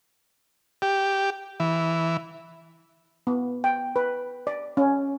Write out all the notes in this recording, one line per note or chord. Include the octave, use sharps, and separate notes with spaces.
G4
E3
B3
G5
B4
D5
C#4